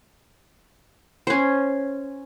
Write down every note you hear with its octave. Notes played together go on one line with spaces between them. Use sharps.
C#4 C5